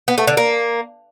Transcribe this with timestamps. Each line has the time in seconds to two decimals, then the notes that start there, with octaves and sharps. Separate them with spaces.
0.08 B3
0.18 A3
0.27 D3
0.37 A#3